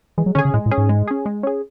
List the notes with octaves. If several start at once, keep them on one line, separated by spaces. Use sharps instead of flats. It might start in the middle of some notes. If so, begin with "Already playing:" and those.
E3 G#3
F#3
D3 C#4 G#4
C#3
A2 G#3
A2
C#4 G#4
G#2
G#3
C#4 G#4
G#3
C#4 G#4